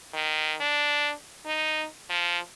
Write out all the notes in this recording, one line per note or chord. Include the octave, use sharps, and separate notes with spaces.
D#3
D4
D#4
F3